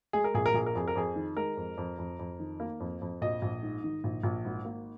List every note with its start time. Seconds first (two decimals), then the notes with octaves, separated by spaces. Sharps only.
0.13 G#3 G#4
0.24 A#4
0.34 A#1 G#4
0.46 A#4
0.54 A#1 G#4
0.66 A#4
0.75 F2 G#4
0.88 A#4
0.95 F2 G#4
1.16 D#3
1.37 G#3 A#4
1.57 F2
1.77 F2
1.98 F2
2.19 F2
2.39 D#3
2.60 A#3
2.80 F2
3.02 F2
3.22 A#1 D#5
3.42 A#1
3.63 G#2
3.84 D#3
4.04 A#1
4.24 A#1
4.45 G#1
4.65 A#3